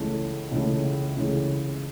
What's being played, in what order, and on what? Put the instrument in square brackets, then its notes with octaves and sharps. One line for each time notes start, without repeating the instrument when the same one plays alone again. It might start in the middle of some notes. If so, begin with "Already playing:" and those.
Already playing: [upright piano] C#2 C#3 E3 A3
C#2 C#3 E3 A3
C#2 C#3 E3 A3